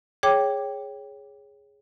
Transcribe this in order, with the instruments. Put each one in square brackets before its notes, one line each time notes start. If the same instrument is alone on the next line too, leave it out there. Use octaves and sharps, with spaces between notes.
[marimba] G#4 C#5 G5 D6